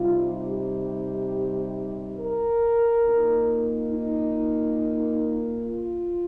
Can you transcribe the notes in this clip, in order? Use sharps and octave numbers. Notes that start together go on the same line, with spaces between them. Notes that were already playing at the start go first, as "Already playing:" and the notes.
Already playing: C3 G3 D#4 F4
G4
A#4
A#2 A#3 D#4
D#4
F4